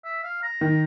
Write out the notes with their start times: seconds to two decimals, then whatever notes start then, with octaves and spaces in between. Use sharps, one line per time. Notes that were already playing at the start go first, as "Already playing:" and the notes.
0.05 E5
0.24 F5
0.43 A#5
0.61 D#3